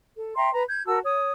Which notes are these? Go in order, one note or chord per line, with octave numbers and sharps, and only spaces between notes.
A4
E5 G5 A#5 C6
B4 A#5
G6 G#6
F#4 A#4 A5 E6
C#5 D#6